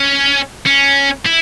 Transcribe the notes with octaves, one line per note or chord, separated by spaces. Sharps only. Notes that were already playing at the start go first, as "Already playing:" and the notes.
Already playing: C#4
C#4
E4